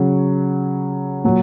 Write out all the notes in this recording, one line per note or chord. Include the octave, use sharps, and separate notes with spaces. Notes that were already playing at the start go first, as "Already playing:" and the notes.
Already playing: C#3 F#3
A#2 F#3